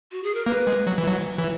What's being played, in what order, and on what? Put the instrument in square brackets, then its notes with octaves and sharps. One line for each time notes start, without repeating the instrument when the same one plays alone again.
[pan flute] F#4
G#4
A#4
[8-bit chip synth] A#3 [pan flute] B4
[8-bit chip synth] G#3
F#3
E3
F#3
E3